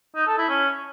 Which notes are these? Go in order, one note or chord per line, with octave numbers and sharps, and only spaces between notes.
D#4
A4
E4
C#4